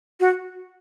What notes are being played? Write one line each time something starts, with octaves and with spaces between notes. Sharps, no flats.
F#4